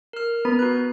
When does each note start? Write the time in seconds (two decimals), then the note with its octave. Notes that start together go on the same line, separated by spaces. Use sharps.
0.13 A#4 F6
0.45 B3 A#5
0.59 F#4 F#6